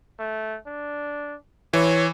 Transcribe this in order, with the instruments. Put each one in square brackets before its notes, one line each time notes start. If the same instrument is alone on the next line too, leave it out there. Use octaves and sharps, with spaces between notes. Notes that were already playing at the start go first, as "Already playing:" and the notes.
[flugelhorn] A3
D4
[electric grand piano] E3 [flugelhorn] C#5